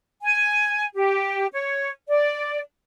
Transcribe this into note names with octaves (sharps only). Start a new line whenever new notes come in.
G#5
G4
C#5
D5